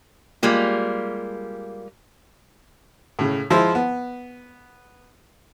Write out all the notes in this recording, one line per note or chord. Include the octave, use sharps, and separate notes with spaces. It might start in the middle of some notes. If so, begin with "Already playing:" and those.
G3 G#3 A#3 F4
A2 C#3
F3 G#3 E4 C5
B3